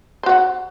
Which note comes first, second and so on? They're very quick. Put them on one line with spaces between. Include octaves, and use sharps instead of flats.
C5 F#4 F#5